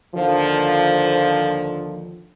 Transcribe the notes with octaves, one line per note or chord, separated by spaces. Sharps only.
D#2 D3 F3